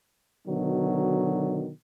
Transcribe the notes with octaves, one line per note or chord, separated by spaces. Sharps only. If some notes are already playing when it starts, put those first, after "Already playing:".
B2 D3 D#3 F#3